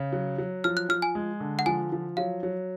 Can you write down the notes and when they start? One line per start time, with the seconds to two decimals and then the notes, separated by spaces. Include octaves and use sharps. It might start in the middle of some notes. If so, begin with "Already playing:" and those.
Already playing: C#3
0.13 F#3
0.38 F#3
0.64 F3 F6
0.77 F#6
0.89 F3 F6
1.02 G#5
1.15 G#3
1.40 D3
1.59 F#5
1.66 F3 G#5
1.92 F3
2.17 F#3 F5
2.43 F#3